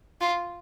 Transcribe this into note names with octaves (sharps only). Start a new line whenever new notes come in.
F4